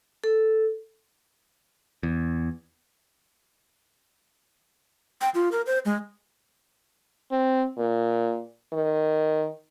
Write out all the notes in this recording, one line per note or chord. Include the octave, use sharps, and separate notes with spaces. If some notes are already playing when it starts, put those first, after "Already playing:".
A4
E2
G5
F4
A#4
C5
G#3
C4
A#2
D#3